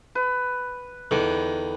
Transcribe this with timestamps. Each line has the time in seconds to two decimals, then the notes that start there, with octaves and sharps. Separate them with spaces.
0.15 B4
1.11 E2 D3 D#3